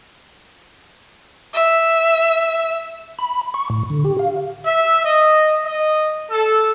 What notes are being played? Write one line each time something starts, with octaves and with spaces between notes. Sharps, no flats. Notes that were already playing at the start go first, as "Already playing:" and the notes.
E5
B5
C#6
A2
D3
G4
F5
E5
D#5
D#5
A4